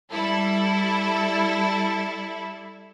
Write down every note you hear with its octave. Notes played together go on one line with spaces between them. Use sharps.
G3 E4 A4